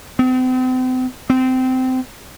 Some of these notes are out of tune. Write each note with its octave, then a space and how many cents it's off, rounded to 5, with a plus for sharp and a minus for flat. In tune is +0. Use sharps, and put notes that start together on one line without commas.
C4 -40
C4 -20